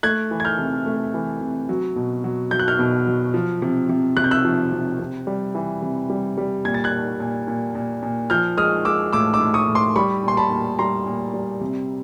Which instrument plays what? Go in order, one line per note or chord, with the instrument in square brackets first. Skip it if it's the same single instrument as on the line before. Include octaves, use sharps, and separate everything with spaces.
[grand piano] A3 F#6 G#6
E3
G#6
F6 G6
C3
A3
E3
C3
F#3
B2
F#3
F#3 G6
F#6
F6 G6
B2
F#3
F3
C3
C3
C3 F#6
G6
E6 F#6
F3
C3
C3
G3
E3
C3
G3
G3
A#2 G#6
A6
F#6 G#6
A#2
A#2
A#2
A#2
A#2
F3 F6 G6
G#3 D#6 F6
G#3 D6 E6
A2 D6 E6
D6 E6
A2
C#6 D#6
A2
C6 D6
G3 B5 C#6
A#2 C6
A5 B5
A#2
G3 A#5 C6
A#2
G3
C3